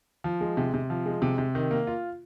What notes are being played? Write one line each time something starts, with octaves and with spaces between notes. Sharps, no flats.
F3
G#3
C3
C3
F3
G#3
C3
C3
D#3
A#3
F4